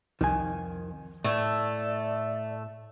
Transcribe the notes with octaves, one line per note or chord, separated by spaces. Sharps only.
C2 F2 D#3 G#5
A2 A3 D5